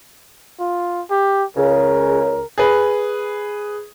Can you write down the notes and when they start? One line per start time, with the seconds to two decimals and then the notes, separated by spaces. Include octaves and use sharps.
0.59 F4
1.10 G4
1.57 C#2 C#3 A#4
2.58 G#4 B4